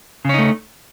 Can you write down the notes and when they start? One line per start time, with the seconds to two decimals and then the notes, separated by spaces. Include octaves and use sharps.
0.25 C#3
0.29 C#4
0.34 D#4
0.38 A3